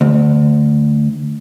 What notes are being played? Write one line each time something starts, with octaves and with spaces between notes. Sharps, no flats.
D2